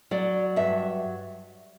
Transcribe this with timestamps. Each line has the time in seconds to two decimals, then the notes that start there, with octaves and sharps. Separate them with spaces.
0.11 F#3 D5
0.56 G2 E5